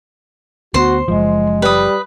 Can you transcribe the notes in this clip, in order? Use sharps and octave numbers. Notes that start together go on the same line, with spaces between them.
D2 B3 F#4 C5 C6
F#1 C#2 F3 G#3
G3 B4 D#6